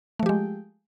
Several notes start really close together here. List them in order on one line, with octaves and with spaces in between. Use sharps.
A3 F3 G4 G#3